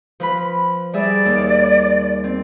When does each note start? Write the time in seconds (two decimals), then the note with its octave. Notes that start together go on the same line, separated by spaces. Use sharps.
0.20 F3 B4 B5
0.93 G3 G#4 D5 E5
1.25 D#2
2.24 C4